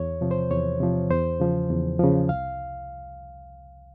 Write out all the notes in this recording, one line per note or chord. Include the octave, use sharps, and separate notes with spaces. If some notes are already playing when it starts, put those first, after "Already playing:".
Already playing: E2 C#5
C3 F3
C5
E2 C#5
C3 F3
E2 C5
C#3 F3
E2
C#3 F3
C2 F5